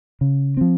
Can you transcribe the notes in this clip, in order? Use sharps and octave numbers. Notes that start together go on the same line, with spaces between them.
C#3
F3 C4